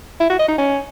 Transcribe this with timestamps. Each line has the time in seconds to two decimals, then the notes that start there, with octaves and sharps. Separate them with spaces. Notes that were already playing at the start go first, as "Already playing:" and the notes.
0.20 E4
0.30 F#4
0.39 D#5
0.49 D#4
0.58 C#4